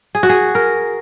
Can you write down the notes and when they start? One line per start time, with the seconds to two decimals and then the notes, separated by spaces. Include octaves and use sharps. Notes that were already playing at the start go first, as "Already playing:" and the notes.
0.15 G#4
0.23 F#4
0.29 G#4
0.55 A#4